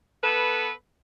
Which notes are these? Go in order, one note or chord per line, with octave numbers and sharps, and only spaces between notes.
B3 A4 B4